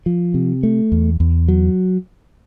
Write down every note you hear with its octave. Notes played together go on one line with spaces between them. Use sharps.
F3
C3
A3
E2
E2
F#3